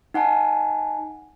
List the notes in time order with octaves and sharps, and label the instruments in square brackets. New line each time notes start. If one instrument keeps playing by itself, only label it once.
[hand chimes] D#4 F#5 G#5 A5